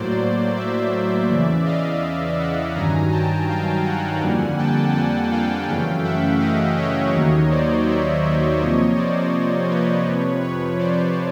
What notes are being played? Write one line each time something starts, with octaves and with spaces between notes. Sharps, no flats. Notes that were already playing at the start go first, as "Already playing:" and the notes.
Already playing: A2 F#3 A#3 C5 D5
D5 E5
E2 C#3 E3
D#5 F5
E5 F#5
G2 D#3 F#3 G#5 A#5
G5 A5
F5 G5
F#5 G#5
F2 D3 G3 A#3
G5 A5
F#5 G#5
F5 G5
F#2 C#3 E3 A3 F5 G5
E5 F#5
D#5 F5
C#5 D#5
D#2 D#3 F#3 A#3
C5 D5
D5 E5
D5 E5
C3 F3 A#3 C#5 D#5
C5 D5
B4 C#5
F2 C3 F3
B4 C#5
C5 D5